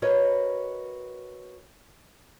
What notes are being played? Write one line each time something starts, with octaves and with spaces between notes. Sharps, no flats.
F#4 A#4 B4 C#5 D#5